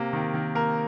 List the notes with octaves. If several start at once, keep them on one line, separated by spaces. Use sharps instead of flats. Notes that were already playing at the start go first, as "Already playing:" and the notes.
Already playing: C3 A#3
D#3
D#3
A#3 A#4